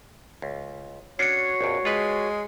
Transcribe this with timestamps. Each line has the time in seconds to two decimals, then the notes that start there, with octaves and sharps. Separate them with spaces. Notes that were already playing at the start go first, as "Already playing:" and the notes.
0.42 C#2
1.19 C#4 D4 F#4 C#5 C7 C#7
1.61 A#1 F2
1.85 G#3 F4 B4